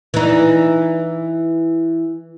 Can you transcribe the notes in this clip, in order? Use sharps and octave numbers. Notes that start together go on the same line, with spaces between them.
E3 D#4